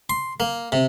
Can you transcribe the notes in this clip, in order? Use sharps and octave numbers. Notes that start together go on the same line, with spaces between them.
C6
A#3
C3